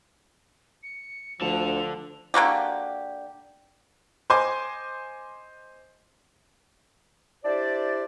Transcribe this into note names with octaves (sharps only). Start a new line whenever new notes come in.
C#7
D2 D3 F3 A5 F7
D3 A#3 F#4 G4
C5 D#5 G#5 C6 D6
D4 E4 G4 C5 D5